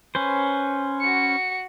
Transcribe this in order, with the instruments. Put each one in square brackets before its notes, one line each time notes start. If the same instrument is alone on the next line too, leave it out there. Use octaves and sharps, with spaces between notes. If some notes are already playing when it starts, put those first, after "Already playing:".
[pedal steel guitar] C#4 B4 C5
[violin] F#4 C#7